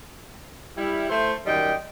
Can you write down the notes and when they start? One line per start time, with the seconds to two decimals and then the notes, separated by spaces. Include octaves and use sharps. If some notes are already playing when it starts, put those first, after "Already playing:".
0.77 G3 E4
1.10 A3 E4 C5
1.46 F#2 D#3 G3 D#5 G5